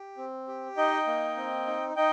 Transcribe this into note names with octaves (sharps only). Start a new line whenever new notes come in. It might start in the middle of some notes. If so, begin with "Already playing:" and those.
Already playing: G4
C4
G4
D#4 D#5 G5
A#3
C4
D#4
D#4 D#5 G5